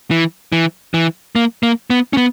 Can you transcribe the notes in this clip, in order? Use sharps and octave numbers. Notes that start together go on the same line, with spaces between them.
E3
E3
E3
A#3
A#3
B3
C#4
B3